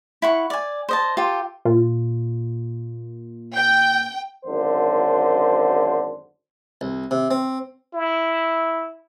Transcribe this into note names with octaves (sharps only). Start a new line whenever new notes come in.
E4 F#5 C#6
D5 G#5
C5 D#5 A5
F4 G4 A4
A#2 F4
G5 G6
G#1 F#2 D3 C5
C2
C3
C4
E4